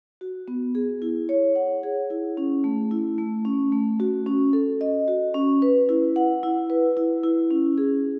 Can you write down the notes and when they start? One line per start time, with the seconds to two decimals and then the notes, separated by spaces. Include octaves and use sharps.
0.21 F#4
0.48 B3
0.75 G#4
1.02 E4
1.29 C#5
1.55 F#5
1.83 G#4
2.10 E4
2.37 C#4
2.64 A3
2.91 E4
3.18 A3
3.45 C#4
3.72 A3
4.00 F#4
4.26 C#4
4.53 A4
4.81 D#5
5.08 F#4
5.34 C#4
5.62 B4
5.89 E4
6.16 F#5
6.43 E4
6.70 B4
6.97 E4
7.24 E4
7.51 C#4
7.78 G#4